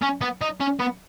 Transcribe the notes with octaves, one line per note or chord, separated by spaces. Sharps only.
C#4
B3
D#4
C#4
B3